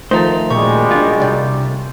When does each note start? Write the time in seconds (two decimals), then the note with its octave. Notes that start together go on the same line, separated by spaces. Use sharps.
0.11 D#3 F3 A3 A4 C5 A#5
0.50 F#2 A#2 G3 G#3 C#6
0.91 D4 F4
1.20 C2 G4 D5 G5